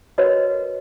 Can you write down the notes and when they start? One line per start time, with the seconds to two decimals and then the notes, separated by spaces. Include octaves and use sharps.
0.18 F#4 A#4 B4 C#5 D#5